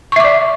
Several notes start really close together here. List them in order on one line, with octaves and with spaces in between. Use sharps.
C#6 E5 D6 D5